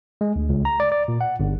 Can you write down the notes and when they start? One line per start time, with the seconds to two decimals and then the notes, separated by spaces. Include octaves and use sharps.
0.21 G#3
0.36 D2
0.49 C#2
0.65 A#5
0.80 D5
0.92 D5
1.08 A#2
1.21 F#5
1.40 G1